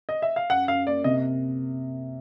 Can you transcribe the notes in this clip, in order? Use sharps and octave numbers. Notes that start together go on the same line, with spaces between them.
D#5
E5
F5
F#2 F#5
F#2 F5
A#3 D5
C3 D#5